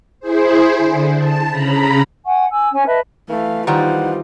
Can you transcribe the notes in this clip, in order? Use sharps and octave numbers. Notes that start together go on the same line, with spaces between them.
E4 G#4 C5
D3
A5
C#3 A#5 B5
F#5 G#5 C#6
G#5 E6
C#4 G#5
B4 D#5 E5 A5
E3 A3 F5
D#3 G3 D#4 F4 C5 F#5